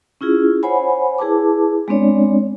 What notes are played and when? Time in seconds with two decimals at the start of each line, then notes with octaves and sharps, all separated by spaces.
0.21 C#4 E4 F4 G#4
0.63 C5 C#5 F#5 G#5 B5
1.18 E4 G#4 B4 A5 D6
1.88 G#3 B3 C4 D4 C#5 D5